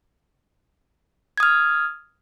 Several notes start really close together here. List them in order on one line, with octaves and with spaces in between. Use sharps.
G#6 D#6 F6